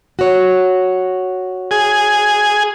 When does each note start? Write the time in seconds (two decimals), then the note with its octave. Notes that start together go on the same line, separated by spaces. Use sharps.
0.19 F#4 C#5
1.71 G#4